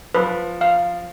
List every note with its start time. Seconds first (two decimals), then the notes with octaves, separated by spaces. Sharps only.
0.14 F3 B4
0.61 F5